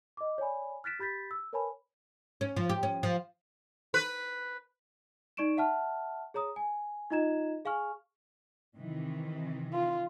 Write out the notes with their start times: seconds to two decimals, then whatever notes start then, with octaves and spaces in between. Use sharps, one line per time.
0.17 D#5 D6
0.38 C#5 D5 G#5 B5
0.84 F6 F#6 A6 B6 D7 E7
0.99 G4 B5 G6 A6 B6
1.31 E6
1.53 A#4 B4 C#5 G#5 A5 B5
2.41 C#4
2.56 F3
2.70 G4
2.83 C#4
3.03 F3
3.94 B4
5.37 D#4 D5 C#6 D7 E7
5.57 E5 F#5 A5 F6
6.34 G#4 C#5 A#5 D#6
6.56 G#5
7.10 D#4 F4 D#5 A#5 G#6 E7
7.65 G#4 F5 G#5 C#6 F6
8.75 C3 D#3 E3
9.73 F4